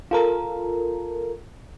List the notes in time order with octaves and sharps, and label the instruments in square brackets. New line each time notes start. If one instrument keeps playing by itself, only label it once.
[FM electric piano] F4 A4 A#4